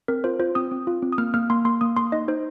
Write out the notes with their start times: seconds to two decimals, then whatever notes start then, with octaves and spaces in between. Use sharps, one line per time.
0.08 C4 A#4
0.24 F4 C5
0.40 F4 C5
0.55 C4 D#6
0.71 C4
0.87 F4
1.02 C4
1.12 D#6
1.18 A#3 F6
1.34 A#3 F6
1.50 A#3 C6
1.65 A#3 C6
1.81 A#3 D#6
1.97 A#3 C6
2.12 D#4 D#5
2.28 D#4 C5